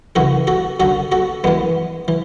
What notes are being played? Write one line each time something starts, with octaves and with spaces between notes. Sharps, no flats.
F#2 C#3 E3 F#4 A4
F#4 A4
F#2 D3 F#4 A4
F#4 A4
F#2 E3 G#3 B3
E3